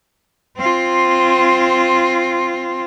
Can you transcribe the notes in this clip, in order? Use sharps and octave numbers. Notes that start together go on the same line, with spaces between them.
C4 F4